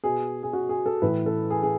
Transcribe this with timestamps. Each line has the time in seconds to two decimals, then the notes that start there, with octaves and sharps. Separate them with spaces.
0.04 B2 G#4
0.43 G#4
0.53 F#4
0.69 G#4
0.86 A4
1.02 A2 E3 B4
1.26 A4
1.50 G#4
1.63 G#4